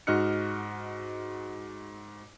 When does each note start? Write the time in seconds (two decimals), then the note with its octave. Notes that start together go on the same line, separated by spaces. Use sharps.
0.07 G#2 F#4 D#5 F6 F#6 C#7